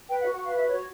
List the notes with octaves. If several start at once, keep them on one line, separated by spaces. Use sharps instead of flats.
B4 G5
F#5
F#4
F#5
B4 F5
F5
F#4 E5
F#4 C#5